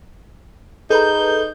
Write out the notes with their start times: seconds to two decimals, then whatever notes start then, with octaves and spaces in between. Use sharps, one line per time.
0.90 D#4 G#4 A4 B4 A#5 G6